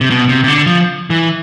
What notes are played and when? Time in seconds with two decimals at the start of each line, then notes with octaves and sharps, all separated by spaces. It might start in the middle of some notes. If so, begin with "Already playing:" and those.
0.01 C3
0.10 B2
0.29 C3
0.44 C3
0.48 D3
0.66 F3
1.10 E3